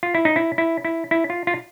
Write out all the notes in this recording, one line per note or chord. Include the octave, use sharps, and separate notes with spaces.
F4
E4
D#4
E4
E4
E4
E4
F4
F4